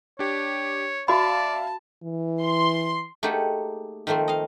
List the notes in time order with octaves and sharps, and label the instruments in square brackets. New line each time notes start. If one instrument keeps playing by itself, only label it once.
[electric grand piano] D4 G4 [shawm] C#5
[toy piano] F#4 B5 [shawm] D5 [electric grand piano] E5 F5 [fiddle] A5
[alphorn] E3
[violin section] C6
[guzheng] A3 A#3 D#4 G4 G#4 F#5
D#3 F3 A3 A#3 C4
D#5 F5